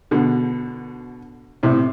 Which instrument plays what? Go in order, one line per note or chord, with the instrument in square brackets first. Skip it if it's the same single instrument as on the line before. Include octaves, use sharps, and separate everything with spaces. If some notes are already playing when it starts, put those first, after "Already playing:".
[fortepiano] B2 D3
A2 C3